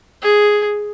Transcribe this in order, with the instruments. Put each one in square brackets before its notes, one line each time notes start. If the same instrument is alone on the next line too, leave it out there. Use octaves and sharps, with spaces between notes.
[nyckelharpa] G#4